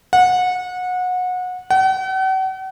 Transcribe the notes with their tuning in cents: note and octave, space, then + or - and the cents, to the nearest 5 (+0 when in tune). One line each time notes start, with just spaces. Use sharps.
F#5 -25
F#5 +45